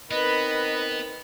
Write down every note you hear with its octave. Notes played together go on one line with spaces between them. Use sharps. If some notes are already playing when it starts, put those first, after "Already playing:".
B3 C4 D#4 A#4 B4 D#5